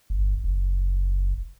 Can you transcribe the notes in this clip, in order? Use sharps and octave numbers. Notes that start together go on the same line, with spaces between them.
G1
F#1